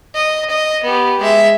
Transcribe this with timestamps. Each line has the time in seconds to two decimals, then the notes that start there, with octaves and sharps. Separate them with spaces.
0.15 D#5
0.50 D#5
0.83 B3 G4
1.20 G#3 E5